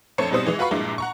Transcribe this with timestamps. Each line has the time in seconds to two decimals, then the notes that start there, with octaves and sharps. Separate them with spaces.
0.18 F2 A3 D4 C5 C#5 C#7
0.31 G#2 B2 G3 C4 C5 D#6
0.46 E3 G#3 D#5
0.58 F4 F#4 B4 F5 B5 C#6
0.71 A#1 G2 A#2 G#3 E4 D6
0.98 F#5 A#5 C#6